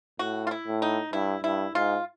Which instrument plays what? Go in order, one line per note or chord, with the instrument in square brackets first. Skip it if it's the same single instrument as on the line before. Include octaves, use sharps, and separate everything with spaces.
[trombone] A2 [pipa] F#4
[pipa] F4
E4
[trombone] A2
[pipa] D#4
[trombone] G2 [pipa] E4
[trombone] G2 [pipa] E4
[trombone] G#2 [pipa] F4